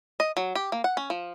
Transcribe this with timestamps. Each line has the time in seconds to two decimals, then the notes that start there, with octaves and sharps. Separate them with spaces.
0.20 D#5
0.37 F#3
0.55 G4
0.72 A#3
0.84 F#5
0.97 C#4
1.10 F3